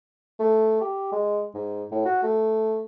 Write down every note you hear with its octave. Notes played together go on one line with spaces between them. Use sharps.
A3
G4
G#3
G#2
A2
F#4
A3